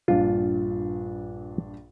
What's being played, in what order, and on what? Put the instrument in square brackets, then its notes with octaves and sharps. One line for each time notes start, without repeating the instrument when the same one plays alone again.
[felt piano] A#1 G2 D4 [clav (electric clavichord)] F4